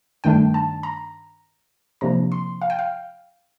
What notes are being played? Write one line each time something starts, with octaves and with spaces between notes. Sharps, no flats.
G2 D#3 A3 D4 G5
A5
A#5
C3 F3 A#3 D4 A#5
C6
F5
G5
F5